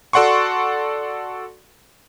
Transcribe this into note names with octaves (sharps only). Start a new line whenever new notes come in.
F#4 A4 D5 F#5 C6 C#6